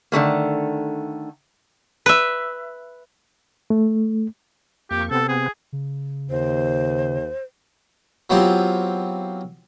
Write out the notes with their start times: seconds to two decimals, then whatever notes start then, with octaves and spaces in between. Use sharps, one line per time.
0.12 D3 D#3 A3 A#3
2.06 B4 E5
3.70 A3
4.91 F2 A#3 G4 C#6
5.11 C3 B3 C4 A4
5.29 G#4
5.73 C#3
6.30 D#2 C5
8.30 F#3 B3 C4 E4 F4 G4